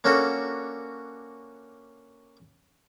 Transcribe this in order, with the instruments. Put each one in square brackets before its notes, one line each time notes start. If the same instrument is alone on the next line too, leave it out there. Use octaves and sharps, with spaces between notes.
[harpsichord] A#3 C#4 D4 F#4 A4